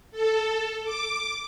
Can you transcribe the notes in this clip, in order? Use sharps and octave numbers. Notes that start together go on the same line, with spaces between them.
A4
D6